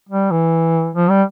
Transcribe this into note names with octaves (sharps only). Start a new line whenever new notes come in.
G3
E3
F3
G3